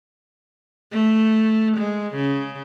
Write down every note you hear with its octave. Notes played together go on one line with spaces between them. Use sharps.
A3
G#3
C#3